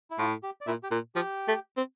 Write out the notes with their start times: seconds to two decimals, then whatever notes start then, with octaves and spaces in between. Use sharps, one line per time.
0.11 E4
0.19 A2 F4
0.43 G4
0.61 D5
0.66 A#2 E4 E5
0.83 G4 G5
0.91 A#2
1.15 F3 G4 G5
1.48 A3
1.77 C4